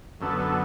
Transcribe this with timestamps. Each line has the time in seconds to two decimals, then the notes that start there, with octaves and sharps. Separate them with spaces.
0.21 F#2 D3 B3 A4
0.40 A4